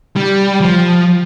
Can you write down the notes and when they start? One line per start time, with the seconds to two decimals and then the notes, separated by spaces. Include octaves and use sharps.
0.16 G3
0.61 F3